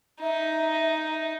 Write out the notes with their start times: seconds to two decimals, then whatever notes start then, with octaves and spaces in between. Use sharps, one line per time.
0.22 D#4 E5